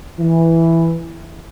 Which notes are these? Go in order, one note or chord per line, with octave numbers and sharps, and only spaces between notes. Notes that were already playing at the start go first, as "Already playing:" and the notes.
E3